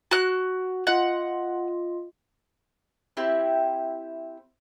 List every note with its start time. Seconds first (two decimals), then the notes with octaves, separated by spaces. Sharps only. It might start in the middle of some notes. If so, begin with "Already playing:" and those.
0.11 F#4 F#6
0.87 F4 D#5 F#5
3.17 C4 E4 G4